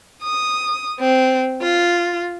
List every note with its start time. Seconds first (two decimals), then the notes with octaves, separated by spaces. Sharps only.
0.23 D#6
1.00 C4
1.61 F4